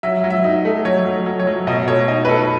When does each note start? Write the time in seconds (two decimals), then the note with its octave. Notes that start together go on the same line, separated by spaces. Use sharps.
0.03 F#3 E5
0.24 F#3
0.30 E5
0.44 D#4
0.65 A3
0.85 F#3 C#5
1.05 F#3
1.26 F#3
1.40 C#5
1.47 F#3
1.67 B2 D#5
1.88 A3 C#5
2.08 D#4 D#5
2.25 B4
2.29 D#4 A4